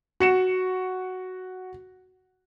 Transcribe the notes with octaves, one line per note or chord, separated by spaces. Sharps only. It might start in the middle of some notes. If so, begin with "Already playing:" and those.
F#4 C#7 E7